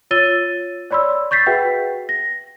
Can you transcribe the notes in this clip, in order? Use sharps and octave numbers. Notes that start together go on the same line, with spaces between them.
F4 C#5 E6 A6 D#7 G7
C#5 D5 B5 C6 E6
C#6 G6 A6 B6 C7
F#4 G#4 B4 E5 F#5 G5
A#6